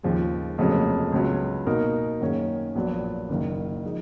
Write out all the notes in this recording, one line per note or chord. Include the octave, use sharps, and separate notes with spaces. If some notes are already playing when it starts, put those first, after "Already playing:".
D#2 C#3 F3 G#3
F1 F2 C#3 F#3 A#3
C#2 C#3 F#3 B3
B2 A#3 D#4 F#4 A#4
F#2 D#3 A#3 C#4 G#4
A#1 A#2 F#3 B3
F#1 F#2 D#3 A#3
F3 G#3 D#4